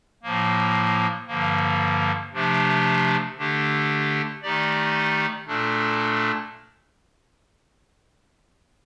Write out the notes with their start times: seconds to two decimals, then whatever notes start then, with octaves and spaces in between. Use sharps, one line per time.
0.23 A2 F3 A#3
1.27 G2 D3 F3 A#3
2.33 C3 F3 A3 D4 G4
3.37 D3 A3 D4 G4
4.42 D#3 A3 D#4 G4 D5
5.47 A#2 A3 D4 A4